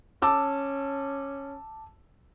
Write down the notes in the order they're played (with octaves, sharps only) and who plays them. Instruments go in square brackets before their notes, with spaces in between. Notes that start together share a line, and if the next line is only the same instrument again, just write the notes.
[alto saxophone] C#4 [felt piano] A5 D6 E6